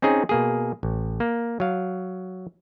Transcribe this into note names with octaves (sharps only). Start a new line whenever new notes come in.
C4 C#4 D#4 G#4
B2 A#3 G#4
A1
A#3
F#3 F5